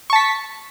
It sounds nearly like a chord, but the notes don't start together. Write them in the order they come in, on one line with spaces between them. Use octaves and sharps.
C#6 A5 B6